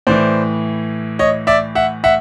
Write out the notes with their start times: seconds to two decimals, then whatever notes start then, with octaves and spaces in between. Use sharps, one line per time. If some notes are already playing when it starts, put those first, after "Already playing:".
0.07 A2 E3 C5 D5
1.19 C#5 D#5
1.47 D5 E5
1.75 E5 F#5
2.04 E5 F#5